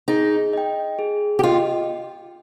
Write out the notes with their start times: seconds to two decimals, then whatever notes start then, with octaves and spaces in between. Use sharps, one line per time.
0.08 D#4 G#4
0.53 D#5 G5
0.99 G#4
1.39 G4
1.43 F4 D#5 G5